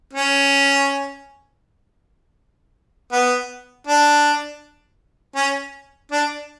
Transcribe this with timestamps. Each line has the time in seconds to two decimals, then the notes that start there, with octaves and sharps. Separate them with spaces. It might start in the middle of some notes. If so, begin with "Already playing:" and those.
0.13 C#4
3.12 B3
3.87 D4
5.36 C#4
6.11 D4